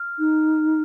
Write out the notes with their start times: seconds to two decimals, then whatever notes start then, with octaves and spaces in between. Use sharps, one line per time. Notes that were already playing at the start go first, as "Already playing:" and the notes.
Already playing: F6
0.19 D#4